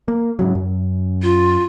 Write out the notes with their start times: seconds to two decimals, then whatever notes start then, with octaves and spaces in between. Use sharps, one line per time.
0.08 A#3
0.39 G#2 C#3 F#3
0.55 F#2
1.22 F4